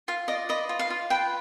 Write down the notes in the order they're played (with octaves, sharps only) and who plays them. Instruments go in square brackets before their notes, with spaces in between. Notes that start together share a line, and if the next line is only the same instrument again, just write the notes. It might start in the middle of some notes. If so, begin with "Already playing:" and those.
[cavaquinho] F4 F5
D5 D#5
B4 D#5
F4
F5
F4
B4 G5